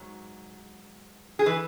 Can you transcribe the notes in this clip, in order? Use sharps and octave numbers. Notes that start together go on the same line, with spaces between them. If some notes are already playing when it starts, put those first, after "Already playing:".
Already playing: G#2 F#3
G#4
E3 B4